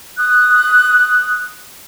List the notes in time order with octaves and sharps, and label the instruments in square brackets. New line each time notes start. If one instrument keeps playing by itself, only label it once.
[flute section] D#6 F#6